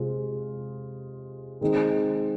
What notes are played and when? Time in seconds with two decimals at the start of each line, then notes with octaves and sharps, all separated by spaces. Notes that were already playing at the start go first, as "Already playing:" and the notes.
Already playing: C3 G#3 F4 G#4 C5
1.61 D#3 G#3 C4 D#4